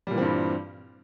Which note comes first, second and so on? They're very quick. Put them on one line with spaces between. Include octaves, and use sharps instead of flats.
G3 A#2 E3 C4 G2